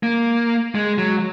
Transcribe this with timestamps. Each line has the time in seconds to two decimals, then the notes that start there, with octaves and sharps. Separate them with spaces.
0.03 A#3
0.75 G#3
0.98 F#3